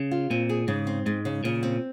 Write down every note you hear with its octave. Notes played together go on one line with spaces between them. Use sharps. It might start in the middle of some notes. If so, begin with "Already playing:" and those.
Already playing: C#3
F4
A#2 C4
G#4
G#2 C#3
C4
G#2 G#3
C#3
A#2 C#3
C4